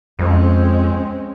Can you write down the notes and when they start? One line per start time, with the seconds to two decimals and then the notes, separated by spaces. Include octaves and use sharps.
0.19 F2 G#3 C4 C#4